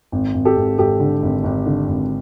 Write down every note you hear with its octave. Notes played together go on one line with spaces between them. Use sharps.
G#1
G#1
G4 A4
G#1
G#1 G4 A4
D3
G#1
G#1
D3
G#1